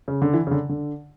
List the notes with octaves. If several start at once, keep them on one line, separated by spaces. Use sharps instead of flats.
C#3
D3
E3
C#3
D3
D3